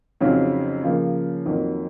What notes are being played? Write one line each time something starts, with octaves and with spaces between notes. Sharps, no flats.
F2 C#3 F#3 C4 D#4
C#3 F3 A#3
F2 D#3 F#3 A#3